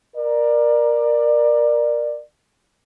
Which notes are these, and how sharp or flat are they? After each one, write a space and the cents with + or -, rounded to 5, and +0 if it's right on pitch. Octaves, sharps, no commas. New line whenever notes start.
A#4 +10 D5 +20